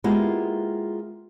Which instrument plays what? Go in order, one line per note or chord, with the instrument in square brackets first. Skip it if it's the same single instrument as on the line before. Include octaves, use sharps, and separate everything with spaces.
[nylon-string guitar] G#3 A#3 B3 E4 F4 G4